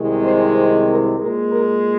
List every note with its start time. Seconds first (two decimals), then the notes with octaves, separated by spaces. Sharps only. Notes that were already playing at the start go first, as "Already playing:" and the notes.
Already playing: C2 C3 D#3 G#3
0.23 C5
0.55 C5
0.87 A#4
1.18 A#2 G#3 A#4
1.50 A#4